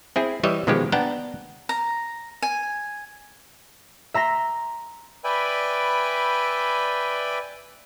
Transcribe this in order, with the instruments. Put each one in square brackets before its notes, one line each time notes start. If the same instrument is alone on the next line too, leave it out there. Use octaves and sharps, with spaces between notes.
[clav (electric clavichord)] C4 E4 G#4
E3 G3 C#5 D#5 E5
B2 D#3 F3 G#3 G4
B3 D4 F#5 G5 A5 A#5
[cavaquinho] A#5
G#5
[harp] E5 A#5 C6 A#6
[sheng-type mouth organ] B4 D5 E5 G5 G#5 B5